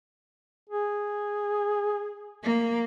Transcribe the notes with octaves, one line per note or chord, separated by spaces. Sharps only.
G#4
A#3